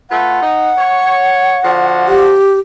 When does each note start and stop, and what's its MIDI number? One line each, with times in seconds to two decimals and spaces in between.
0.10 0.38 57
0.10 0.38 65
0.10 0.38 71
0.10 2.23 78
0.41 0.71 63
0.77 1.58 73
1.64 2.36 50
1.64 2.36 53
1.64 2.36 66
2.08 2.59 67